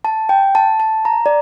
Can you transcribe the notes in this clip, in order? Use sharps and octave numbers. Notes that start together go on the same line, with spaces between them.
A5
G5
A5
A5
A#5
D5